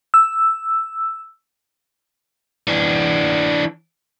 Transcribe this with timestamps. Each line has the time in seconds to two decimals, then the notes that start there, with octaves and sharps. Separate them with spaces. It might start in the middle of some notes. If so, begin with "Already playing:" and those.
0.14 E6
2.67 E3 D4